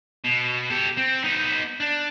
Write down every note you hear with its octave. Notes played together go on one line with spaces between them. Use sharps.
B2
G4 A4
C4
B3 D#4
D4